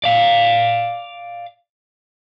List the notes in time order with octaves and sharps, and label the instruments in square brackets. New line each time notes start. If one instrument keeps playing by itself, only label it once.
[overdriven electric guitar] D5 F5